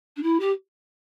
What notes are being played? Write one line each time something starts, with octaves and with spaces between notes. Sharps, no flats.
D4
E4
G4